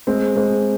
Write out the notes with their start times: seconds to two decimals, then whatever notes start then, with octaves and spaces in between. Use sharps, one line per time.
0.07 G#3 C4
0.36 G#3 C4